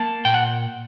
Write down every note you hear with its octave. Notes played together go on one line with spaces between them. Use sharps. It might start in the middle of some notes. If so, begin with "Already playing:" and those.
Already playing: A#3 A5
A#2 G5
F#5